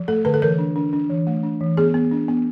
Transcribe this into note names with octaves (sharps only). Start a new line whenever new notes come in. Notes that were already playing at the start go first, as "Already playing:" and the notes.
Already playing: F3
A3 A4
D3 B4
A4
E3 A#4
D4
D4
D4
E3
A3
D4
E3
B3 G#4
B3
D4
B3